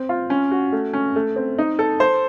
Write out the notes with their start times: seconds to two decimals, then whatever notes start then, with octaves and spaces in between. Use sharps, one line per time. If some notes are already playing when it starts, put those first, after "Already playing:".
Already playing: C4
0.09 F4
0.30 C#4
0.52 F#4
0.72 A3
0.93 C#4
1.16 A3
1.36 C4
1.58 D#4
1.79 A4
2.00 C5